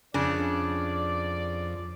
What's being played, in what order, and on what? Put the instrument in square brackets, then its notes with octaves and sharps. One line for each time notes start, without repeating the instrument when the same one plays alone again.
[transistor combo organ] F2 [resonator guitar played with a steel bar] C#3 D4 [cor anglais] D5